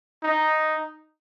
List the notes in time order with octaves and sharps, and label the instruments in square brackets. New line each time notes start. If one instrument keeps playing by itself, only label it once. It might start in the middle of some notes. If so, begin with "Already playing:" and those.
[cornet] D#4